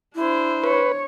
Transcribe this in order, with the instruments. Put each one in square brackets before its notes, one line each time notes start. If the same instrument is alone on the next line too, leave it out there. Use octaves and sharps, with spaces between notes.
[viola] D4 C5 [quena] E4
[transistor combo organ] B4 [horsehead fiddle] C#5